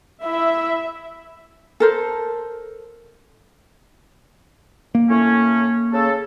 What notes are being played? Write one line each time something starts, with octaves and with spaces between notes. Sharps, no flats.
E4 E5
A4 A#4 C5
A#3
A2 C#4
C#3 A4